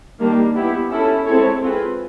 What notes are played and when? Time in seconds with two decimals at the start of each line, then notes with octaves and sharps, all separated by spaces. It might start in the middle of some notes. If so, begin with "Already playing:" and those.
0.19 D#3 G3 A#3 D4
0.55 B3 E4 G4
0.90 C#4 E4 A4
1.25 G#3 C4 E4 A4 C#5
1.60 C4 F4 G#4 B4